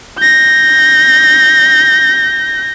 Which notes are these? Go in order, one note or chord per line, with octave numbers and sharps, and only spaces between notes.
G6 A#6